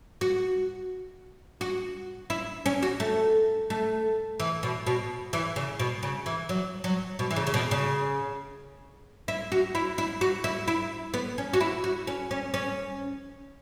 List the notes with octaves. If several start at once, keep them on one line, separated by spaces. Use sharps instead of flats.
F#4
F#4
E4
C#4
F#4
A3
A3
E3
B2
B2
E3
C#3
B2
C#3
E3
F#3
F#3
B2
E3
C#3
C#3
B2
C#3
E4
F#4
E4
E4
F#4
E4
E4
B3
C#4
F#4
E4
F#4
C#4
C#4
C#4